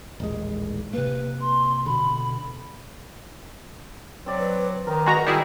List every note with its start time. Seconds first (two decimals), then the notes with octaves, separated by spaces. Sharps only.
0.20 D#1 A1 G#3
0.93 C3 A#3 B4
1.41 C6
1.86 B2 D3 B5
4.26 F#3 C4 D5
4.39 B4
4.87 D#3 A#4 B4
5.06 G#3 F#4 B4 A#5
5.26 D#3 G3 E4 F#4 G#4 D#5